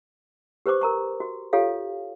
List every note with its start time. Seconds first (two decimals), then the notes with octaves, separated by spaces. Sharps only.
0.66 G4 B4 C5 C#6 D6
0.81 A#4 A#5 C#6
1.20 F#4
1.53 F4 G4 A4 C#5 F5